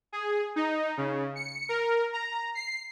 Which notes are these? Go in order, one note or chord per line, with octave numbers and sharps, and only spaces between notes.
G#4
D#4
C#3
C#7
A#4
A#5
C7